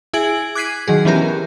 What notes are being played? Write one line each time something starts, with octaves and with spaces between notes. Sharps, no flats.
E4 G#4 G#5 G#6 D7 F#7
D6 F#6 G#6 B6 C7 D#7
D#3 F#3 G#4
E3 B3 C#4 G4 A#4